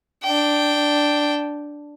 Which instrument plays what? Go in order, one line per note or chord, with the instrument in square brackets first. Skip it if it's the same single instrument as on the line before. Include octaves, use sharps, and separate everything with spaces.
[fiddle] D4 G5